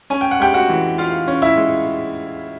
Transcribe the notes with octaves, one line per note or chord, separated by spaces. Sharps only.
C#4 G#5
G5
F#5
G#3 G4 G5
F#4 F#5
E3
F4 F5
C#4
E4 E5
G#3